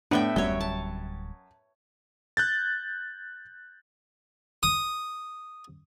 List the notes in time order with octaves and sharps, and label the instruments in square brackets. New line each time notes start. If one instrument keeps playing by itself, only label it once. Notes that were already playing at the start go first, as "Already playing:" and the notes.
[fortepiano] A2 [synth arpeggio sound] B3 D4 [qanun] B4 E5 G5
[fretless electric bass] D1 G3 [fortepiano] F#2 [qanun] C#5 G5
[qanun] A5
[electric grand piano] F#6 G6 A6
[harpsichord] D#6